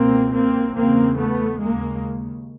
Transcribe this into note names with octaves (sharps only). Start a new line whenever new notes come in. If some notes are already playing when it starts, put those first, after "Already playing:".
Already playing: C#2 B2 A#3 C4
A#3 C4
E2 C#3 A#3 C4
A3 B3
D#2 C#3 G#3 A#3